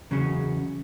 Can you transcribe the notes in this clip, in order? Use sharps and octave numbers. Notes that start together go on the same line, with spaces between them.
E2 C#3 F#3 C#4